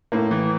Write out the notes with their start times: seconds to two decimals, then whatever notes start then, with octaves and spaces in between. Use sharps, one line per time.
0.12 A2 A#3
0.31 E3